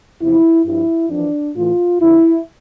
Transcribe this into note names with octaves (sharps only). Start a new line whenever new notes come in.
E2 C3 F3 E4
G2 F3 E4
F2 E3 D4
A2 E3 F4
F2 D3 F3 E4